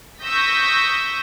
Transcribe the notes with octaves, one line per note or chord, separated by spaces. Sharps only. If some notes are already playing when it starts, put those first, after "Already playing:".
C#6 D#6 E6 G6 A#6 B6